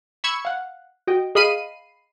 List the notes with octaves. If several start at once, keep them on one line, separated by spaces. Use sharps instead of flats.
B5 C#6 E6 G#6 C#7
F5 F#5
F#4 D#5 G5
G#4 D#5 F5 B5 C7 D#7